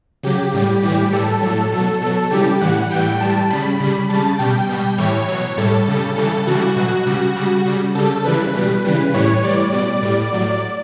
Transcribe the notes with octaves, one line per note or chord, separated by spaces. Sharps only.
C#3 F#3 G4
A2 G3
A2 E3 G3 G4
A2 G3 A4
A2 F#3
B2 F#3
B2 F#3 A4
C#3 E3 G3 G4
A2 E3 G3 F#5
A2 E3 G3 G5
A2 G3 A5
C#3 G3 B5
C#3 G3
C#3 G3 A5
B2 G3 G5
B2 G3
A2 E3 G3 C#5
B2 F#3
A2 G3 A4
C#3 G3
C#3 E3 G3 A4
C#3 E3 G3 F#4
B2 F#3 F#4
C#3 G3
C#3 G3
C#3 G3
C#3 G3 A4
C#3 E3 G3 B4
B2 G3
C#3 E3 G3
A2 E3 G3 C#5
A2 G3 D5
B2 G3 D5
A2 G3
A2 F#3